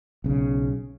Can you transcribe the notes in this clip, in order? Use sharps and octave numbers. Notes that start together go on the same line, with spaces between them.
B1 C#3